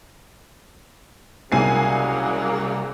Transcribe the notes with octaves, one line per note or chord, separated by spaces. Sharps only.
C2 C#3 F#3 A#3 G#5 C7